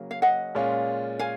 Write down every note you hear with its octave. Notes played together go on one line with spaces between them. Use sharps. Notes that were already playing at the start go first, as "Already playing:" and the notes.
Already playing: C#3 F#3 A#3
F5
D#5 F#5
A#2 G#3 C#4 F4
F5 G#5